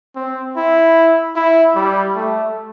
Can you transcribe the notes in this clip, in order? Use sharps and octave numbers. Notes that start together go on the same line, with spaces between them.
C4
E4
E4
G3
A3